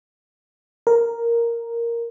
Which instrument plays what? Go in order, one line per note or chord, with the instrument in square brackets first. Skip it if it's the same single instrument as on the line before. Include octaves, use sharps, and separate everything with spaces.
[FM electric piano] A#4